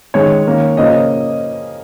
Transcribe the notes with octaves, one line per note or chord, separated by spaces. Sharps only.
D#3 G#3 C#4 C#5
D#3 A#3 C#4
C#3 F3 A#3 C#4 D#5